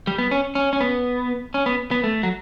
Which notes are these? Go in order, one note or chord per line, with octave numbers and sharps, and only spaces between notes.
G3
B3
C#4
C#4
C#4
B3
C#4
B3
B3
A3
F#3